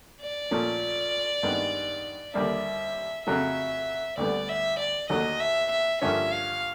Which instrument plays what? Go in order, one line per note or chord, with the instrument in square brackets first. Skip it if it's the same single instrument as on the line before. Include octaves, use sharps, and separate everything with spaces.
[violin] D5
[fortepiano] A#2 F3 A3 C#4
G2 D#3 G#3 B3
[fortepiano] D#2 D3 G3 A#3 D4 [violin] E5
[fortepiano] F2 C#3 F#3 A3 [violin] E5
[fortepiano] D2 D3 G3 B3 [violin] D5
[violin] E5
D5
[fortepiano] D#2 D3 F#3 A3 [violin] D#5
[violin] E5
E5
[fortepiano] G2 D3 F3 A#3 C#4 [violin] E5
[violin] F5